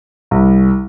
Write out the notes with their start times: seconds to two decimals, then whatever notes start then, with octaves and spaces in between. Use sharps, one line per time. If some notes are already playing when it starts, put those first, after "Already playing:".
0.31 C2